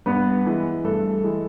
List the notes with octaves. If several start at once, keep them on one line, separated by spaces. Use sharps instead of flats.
G2 B3 B4
E3 G#3
G2 A3 A4
E3 G#3